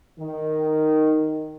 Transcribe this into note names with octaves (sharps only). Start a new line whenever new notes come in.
D#3